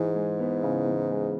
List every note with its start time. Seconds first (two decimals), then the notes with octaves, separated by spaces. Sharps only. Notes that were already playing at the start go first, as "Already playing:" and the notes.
Already playing: G#2 E3
0.15 G#3
0.39 B3
0.63 C#3
0.87 E3
1.11 G#3